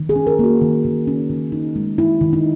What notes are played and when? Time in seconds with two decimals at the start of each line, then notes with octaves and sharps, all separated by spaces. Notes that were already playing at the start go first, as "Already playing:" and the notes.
Already playing: D#3
0.09 G#4
0.16 C#4
0.27 A#4
0.39 A#3 F#4
0.61 D#3
0.85 D#3
1.07 C#4
1.30 D#3
1.52 D#4
1.76 G#3
1.98 D#3 E4
2.21 D#3
2.33 D#4